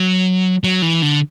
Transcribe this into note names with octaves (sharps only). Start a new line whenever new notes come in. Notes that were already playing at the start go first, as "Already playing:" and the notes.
Already playing: F#3
F#3
E3
D3